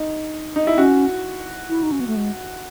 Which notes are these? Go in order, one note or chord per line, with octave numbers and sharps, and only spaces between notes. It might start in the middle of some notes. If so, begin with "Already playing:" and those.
Already playing: D#4
D#4
E4
C#4 F#4
E4
D#4
C#4
B3
A3
G#3